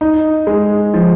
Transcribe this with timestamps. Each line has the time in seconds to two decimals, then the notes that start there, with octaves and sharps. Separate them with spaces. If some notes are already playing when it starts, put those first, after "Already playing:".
0.01 D#4
0.47 G#3
0.94 F3